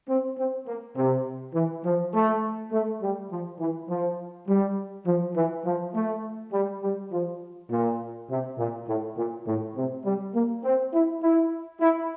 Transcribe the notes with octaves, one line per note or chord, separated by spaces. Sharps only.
C4
C4
A#3
C3
E3
F3
A3
A3
G3
F3
E3
F3
G3
F3
E3
F3
A3
G3
G3
F3
A#2
C3
A#2
A2
A#2
A2
C3
G3
A#3
C4
E4
E4
E4